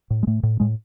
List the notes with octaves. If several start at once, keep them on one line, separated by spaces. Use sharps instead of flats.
A2
G#3
A2 A3
A2
A2 G#3